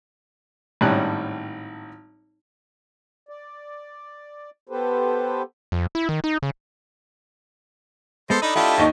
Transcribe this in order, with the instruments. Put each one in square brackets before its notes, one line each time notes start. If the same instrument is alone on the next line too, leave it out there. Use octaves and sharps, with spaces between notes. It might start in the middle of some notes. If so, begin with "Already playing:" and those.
[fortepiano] G#1 A2 G3 C#4 F#6
[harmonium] D5
B3 G4 A4 B4 C5
[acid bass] F2
E4
D#3
D#4
C#3
[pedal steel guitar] G#3 B3 [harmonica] A4 C5
[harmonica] D4 D#4 A4 [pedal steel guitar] D#5 B5
[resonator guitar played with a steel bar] A3 D4 [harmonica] E4 F4 G4
[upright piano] D#2 D#4 C#6